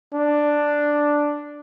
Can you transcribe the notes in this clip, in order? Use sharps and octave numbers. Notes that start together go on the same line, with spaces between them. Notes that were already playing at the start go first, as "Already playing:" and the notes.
D4